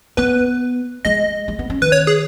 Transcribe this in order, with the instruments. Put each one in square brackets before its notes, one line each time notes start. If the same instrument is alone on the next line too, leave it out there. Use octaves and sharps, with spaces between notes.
[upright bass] B3 [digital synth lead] B4
[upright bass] G#3 [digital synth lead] D#5
[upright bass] G#3
B3
C#4
[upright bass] D#3 [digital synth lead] B4
[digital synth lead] C#5
G#4